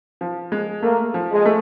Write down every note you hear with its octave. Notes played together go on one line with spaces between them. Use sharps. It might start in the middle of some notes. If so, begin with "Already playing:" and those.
F3
G#3
A3 A#3
F3
G#3
A3